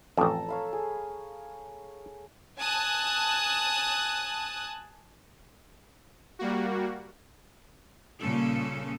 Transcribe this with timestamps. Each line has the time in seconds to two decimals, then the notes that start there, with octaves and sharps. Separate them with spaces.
0.17 A1 F2 A4 A5 A#5
0.49 C#5 F5 B5
0.73 G#4
2.58 G#5 A5 D#6 F#6
6.39 G3 A#3 F#4
8.20 A#2 C#3 G3 C#4 A4